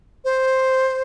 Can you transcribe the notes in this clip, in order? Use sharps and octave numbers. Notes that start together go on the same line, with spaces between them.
C5